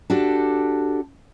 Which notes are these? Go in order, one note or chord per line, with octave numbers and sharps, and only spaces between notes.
D4 F#4 G4 A4